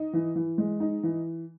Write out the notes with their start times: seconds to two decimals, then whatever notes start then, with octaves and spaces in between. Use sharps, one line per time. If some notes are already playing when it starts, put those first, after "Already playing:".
Already playing: D#4
0.13 E3
0.36 E3
0.58 G#3
0.80 D#4
1.03 E3